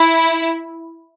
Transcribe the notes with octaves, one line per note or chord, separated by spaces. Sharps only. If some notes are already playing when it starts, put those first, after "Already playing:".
Already playing: E4